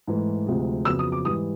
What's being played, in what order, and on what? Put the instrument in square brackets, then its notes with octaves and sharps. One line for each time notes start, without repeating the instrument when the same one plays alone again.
[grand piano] G#2 E3 A3
D2 C3 F3 G#3
F2 C#3 F#3 B3 E6
D#6
D6
G#2 E3 G3 D#6